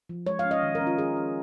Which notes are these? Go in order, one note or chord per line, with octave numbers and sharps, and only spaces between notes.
F3
G#3 C#5
F5
C#4
D#5
D#3
A#4
C#4
F4
D#3 G#4
C#4